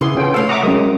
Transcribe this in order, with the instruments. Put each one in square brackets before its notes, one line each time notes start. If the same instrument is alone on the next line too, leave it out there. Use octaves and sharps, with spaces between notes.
[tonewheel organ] C#3 [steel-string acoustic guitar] E3 B3 [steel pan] E4 G#4 C6
[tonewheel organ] C#4 G5 [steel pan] F4 A4
[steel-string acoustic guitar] C3 A3 C#5 [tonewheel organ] A4 [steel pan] F5
[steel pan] E5 D6 D#6 [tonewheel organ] F#5 A#5
[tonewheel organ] F#3 G#3 [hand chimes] C#4 A#4 [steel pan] D#6